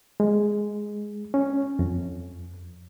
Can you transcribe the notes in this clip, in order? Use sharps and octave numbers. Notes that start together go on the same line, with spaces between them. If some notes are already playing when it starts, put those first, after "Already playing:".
G#3
C#4
F2